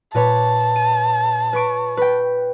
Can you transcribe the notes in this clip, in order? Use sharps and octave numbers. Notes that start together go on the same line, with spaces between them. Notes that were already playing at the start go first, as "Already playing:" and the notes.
A#2 B4 C#5 A5
D#7
B4 C#6 D7
B4 G5